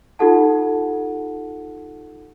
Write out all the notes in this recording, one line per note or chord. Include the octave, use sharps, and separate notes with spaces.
D#4 F4 G4 A4 F#5 A5